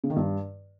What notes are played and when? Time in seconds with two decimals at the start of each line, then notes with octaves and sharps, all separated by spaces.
0.04 C#3
0.10 D#3
0.16 G2